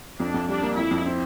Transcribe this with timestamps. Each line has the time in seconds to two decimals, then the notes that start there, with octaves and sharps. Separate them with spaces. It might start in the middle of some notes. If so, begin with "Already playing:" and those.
0.20 F2 D4
0.34 F2
0.48 G3 D4
0.63 A#3
0.77 F2 E4
0.91 F2
1.06 C4